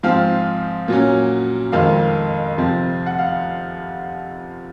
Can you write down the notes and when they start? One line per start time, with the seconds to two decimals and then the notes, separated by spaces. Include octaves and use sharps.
0.03 G#2 F3 C4 F5
0.88 A#2 F#3 C#4
1.72 F2 D#3 G#3 C4 F5
2.57 F2 C3 F3 C4
3.06 F#5
3.18 F5